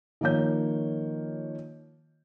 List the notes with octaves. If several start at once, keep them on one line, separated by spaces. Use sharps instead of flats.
D#3 F3 A#3 C#5 G6